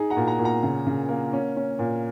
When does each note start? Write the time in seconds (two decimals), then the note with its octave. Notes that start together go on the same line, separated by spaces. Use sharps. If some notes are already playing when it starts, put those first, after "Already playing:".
Already playing: D#4 G#4
0.10 F#5 A#5
0.17 A#2
0.28 F#5 A#5
0.39 A#2
0.45 F#5 A#5
0.63 C#3
0.87 C#3
1.09 A#3
1.33 C#4
1.56 C#4
1.79 A#2